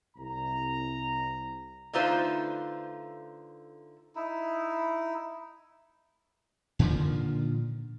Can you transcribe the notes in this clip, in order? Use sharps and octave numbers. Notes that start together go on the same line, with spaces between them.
C2 A#5
D3 A3 D#4 F4 B4 C5
D#4 E4
A#2 D3 D#3 F3